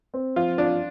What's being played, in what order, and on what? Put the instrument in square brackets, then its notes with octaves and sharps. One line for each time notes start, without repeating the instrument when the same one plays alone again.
[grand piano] C4
[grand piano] F3 [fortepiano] F4
[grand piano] F3 [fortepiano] D4